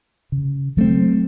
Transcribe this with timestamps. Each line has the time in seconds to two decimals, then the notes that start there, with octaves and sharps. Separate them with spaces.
0.32 C#3
0.77 F#3 A3 C4